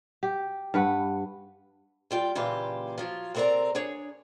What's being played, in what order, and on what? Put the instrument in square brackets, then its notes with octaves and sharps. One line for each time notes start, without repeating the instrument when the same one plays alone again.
[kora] G4
G2 B4 F#5
[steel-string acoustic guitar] G3 F4 G5
A#2 C#3 E3 F4 G4
F3 F#3 F4
C3 A3 C4 A#4 D5 A#5
D4 G#4 C#5